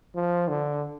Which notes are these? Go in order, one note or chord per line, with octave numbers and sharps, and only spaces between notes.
F3
D3